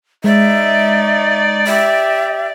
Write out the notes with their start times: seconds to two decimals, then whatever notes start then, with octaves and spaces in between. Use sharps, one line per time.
0.24 G#3 D#4 D5 E5
1.67 G4 E5